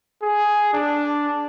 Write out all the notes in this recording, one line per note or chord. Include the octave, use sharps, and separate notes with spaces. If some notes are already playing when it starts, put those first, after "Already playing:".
G#4
D4